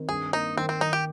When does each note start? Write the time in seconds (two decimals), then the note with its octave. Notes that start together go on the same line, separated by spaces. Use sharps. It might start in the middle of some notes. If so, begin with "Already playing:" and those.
Already playing: D#3 C4
0.09 G2 G#4
0.33 A#3 D#4
0.57 D#3 C4
0.69 C4
0.81 D#3 D#4
0.93 G4